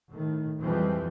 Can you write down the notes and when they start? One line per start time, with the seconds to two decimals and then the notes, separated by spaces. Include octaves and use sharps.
0.10 A2 D#3
0.60 F2 E3 F3 G3 G#3 C4